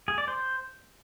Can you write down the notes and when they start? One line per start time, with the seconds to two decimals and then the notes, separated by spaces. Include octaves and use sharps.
0.08 G#4
0.18 D5
0.28 C5